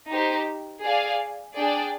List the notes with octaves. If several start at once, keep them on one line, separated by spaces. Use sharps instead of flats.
D#4 G4 C5
G#4 D5 F5 G#5
D4 G#4 D5 G5